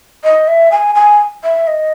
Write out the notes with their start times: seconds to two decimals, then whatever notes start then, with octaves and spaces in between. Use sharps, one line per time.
0.24 D#5
0.48 E5
0.72 G#5
0.95 G#5
1.44 E5
1.67 D#5